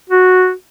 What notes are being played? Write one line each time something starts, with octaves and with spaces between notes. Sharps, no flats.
F#4